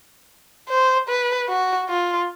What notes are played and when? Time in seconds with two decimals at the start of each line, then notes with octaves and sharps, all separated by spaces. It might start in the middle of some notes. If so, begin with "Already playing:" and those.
0.69 C5
1.09 B4
1.49 F#4
1.89 F4